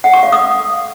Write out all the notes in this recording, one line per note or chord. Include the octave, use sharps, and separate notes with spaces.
F#5
C#6
F5
D#6